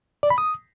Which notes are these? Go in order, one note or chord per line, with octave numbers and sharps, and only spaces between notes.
D5
B5
D#6